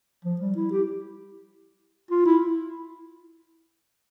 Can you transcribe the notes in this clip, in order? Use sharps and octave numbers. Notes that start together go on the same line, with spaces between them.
F3
G3
E4
G4
F4
E4